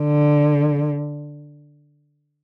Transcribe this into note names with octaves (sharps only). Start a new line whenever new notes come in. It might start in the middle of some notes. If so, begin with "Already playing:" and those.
Already playing: D3